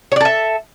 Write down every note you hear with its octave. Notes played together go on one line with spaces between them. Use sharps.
A4 C#5 D5 E5